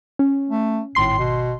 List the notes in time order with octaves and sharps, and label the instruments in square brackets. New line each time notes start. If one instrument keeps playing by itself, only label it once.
[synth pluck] C#4
[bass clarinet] A3
[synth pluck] G#1 C6 C7 [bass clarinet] A2
[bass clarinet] B2